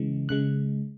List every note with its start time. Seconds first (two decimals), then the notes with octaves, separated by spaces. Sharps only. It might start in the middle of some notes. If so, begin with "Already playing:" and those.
Already playing: C#3 E3 G#3
0.29 C#3 G#3 F#6